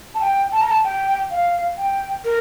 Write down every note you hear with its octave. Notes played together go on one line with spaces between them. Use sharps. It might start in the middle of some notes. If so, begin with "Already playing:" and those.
A5
G5
A5
A#5
A5
G5
F5
G5
A#4